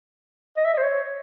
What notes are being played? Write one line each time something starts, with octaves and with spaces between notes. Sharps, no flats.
D#5
E5
D#5
C5
C#5